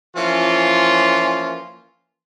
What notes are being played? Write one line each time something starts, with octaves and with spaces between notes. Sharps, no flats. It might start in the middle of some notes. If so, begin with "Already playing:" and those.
E3 F3 A#3 C#4 F4